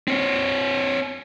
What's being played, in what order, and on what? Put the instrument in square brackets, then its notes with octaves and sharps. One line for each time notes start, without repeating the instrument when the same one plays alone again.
[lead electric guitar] C4 C#5